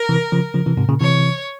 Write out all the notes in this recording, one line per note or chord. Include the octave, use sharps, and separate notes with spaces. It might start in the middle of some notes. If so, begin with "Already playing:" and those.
Already playing: A#4
C3 E3
C#3 F3
C#3 F3
C3 E3
G#2 C3
A#2 C#3
C3 E3 C#5